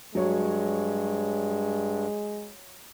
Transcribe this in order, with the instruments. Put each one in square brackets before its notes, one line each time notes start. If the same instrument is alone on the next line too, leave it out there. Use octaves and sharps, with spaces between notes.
[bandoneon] G2 [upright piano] F#3 C#5 [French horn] G#3